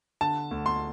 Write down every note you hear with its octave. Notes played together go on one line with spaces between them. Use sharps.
D3 A5
D2
C6